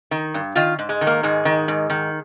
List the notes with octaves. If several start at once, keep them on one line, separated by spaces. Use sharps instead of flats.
D#3
G2
D#3 F4
G#2
G#3
D#3
A#3
G#2 G#3
D#3
G#2
D#3